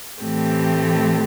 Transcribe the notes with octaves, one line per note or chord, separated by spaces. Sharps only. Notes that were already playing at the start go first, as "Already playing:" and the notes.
A2 E3 A3 C4 G4